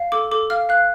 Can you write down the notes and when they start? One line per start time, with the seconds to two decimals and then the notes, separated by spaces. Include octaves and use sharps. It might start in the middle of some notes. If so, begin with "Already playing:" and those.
Already playing: F5
0.12 A4 D6
0.31 A4 D6
0.50 F5 F6
0.69 F5 F#6